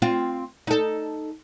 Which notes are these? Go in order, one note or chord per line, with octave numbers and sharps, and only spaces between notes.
C4 F4
D#4 A4